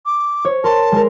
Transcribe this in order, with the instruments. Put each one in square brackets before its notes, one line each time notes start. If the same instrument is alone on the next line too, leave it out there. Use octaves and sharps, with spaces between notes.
[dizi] D6
[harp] C#5
[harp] A#4 C6 [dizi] A5
[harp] G#3 A#4